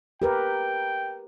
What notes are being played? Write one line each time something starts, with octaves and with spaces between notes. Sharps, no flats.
G4 A#4 B4 G5